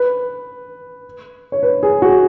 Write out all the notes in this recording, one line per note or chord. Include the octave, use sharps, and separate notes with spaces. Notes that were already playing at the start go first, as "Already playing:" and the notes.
Already playing: B4
C#5
B4
G#4
F#4